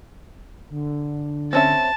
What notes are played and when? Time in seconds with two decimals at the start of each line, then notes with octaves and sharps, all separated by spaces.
0.70 D3
1.53 C4 C#4 E5 A5